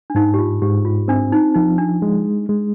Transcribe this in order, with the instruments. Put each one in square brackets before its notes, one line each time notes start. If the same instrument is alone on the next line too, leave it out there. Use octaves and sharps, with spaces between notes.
[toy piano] D4
[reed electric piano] G#2 [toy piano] D#4
[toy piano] G4
F4
[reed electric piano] G#2 [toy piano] G4
[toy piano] F4
[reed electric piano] C4 [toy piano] D4
[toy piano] D#4
[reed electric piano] F3 [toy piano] D#4
[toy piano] D4
[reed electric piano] G#3
G#3